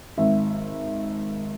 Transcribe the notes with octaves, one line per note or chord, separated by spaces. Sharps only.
G#1 E5